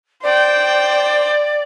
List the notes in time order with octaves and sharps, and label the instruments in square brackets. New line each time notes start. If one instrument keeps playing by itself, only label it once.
[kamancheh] C5 G5 [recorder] D5